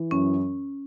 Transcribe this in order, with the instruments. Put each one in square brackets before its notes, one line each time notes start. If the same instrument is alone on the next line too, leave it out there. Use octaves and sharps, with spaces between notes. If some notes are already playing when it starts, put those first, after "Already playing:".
Already playing: [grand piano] E3
[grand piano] F#2 [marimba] C#4